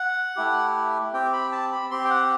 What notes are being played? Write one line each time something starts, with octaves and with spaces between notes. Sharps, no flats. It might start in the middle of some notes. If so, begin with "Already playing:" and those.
Already playing: F#5
A3 E4 G4
C4 G4 G5
B5
A5
B5
C4 G4 C6
G5
F#5